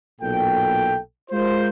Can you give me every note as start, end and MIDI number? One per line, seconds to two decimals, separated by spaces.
0.21 0.98 35
0.21 0.98 46
0.21 0.98 69
0.21 0.98 79
1.30 1.69 56
1.30 1.69 65
1.30 1.69 70
1.30 1.69 72